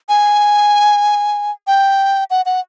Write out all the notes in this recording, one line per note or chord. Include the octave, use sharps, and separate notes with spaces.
G#5
G5
F#5
F#5